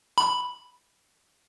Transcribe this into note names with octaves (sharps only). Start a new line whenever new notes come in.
B5